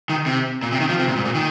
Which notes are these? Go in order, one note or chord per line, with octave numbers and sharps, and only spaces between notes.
D#3
C3
A#2
C3
D#3
F3
C3
A#2
G#2
A#2
D#3